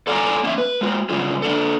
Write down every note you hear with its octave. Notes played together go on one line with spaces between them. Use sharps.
A4 D5 F5 G5 G#5 A#5
A#3 C#4 C#5 E5
B4
G#3 A#3 F#4
C#3 F#3 G3 C#4 F4 G#4
A#3 D4 A4